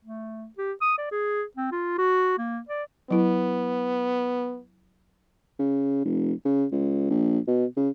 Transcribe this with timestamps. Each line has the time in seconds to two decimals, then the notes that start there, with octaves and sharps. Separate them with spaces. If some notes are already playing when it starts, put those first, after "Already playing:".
0.04 A3
0.58 G4
0.81 D#6
0.98 D5
1.12 G#4
1.57 C4
1.72 F4
1.98 F#4
2.38 A#3
2.69 D5
3.11 F#3 B3 E4
5.59 C#3
6.05 F1
6.45 C#3
6.71 C#2
7.10 A#1
7.47 B2
7.76 C#3